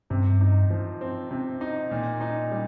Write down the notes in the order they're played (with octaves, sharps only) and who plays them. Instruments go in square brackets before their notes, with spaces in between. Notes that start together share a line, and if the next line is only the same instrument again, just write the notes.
[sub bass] G2 [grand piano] C3
[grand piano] D#4
F3
C4
C3
D#4
A#2
D#4
G3